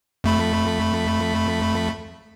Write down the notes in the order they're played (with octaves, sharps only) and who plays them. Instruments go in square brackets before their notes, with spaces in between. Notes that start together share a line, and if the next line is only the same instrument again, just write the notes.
[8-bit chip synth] F2 A3 B5